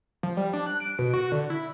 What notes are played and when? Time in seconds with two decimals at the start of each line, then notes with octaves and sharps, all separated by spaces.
0.23 F3
0.37 G3
0.53 D4
0.66 F#6
0.80 D7
0.99 B2
1.14 F#4
1.32 D3
1.50 E4